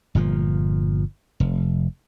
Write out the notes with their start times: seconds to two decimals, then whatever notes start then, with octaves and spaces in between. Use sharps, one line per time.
0.15 G1 A#2 F3
1.40 F1